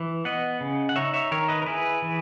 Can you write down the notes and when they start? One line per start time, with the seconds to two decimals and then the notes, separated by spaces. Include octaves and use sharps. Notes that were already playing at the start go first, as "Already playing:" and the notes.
Already playing: E3
0.25 B3 D#5 F#5
0.60 C#3
0.89 F#5
0.96 D#4 C#5 E5
1.14 C#5 E5
1.31 D#3 A#4 C#5
1.49 B4 D#5
1.62 A#4
1.66 E4 G#4 B4
2.02 E3